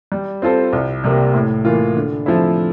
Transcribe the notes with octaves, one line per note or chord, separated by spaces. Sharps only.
G3
C4 F4 A4 C5
C2
C3 G3 A#3
A2
E3 A#3 F4
D3
F3 A3 C4 E4